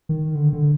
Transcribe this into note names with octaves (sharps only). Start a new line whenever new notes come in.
D#3
D3
D3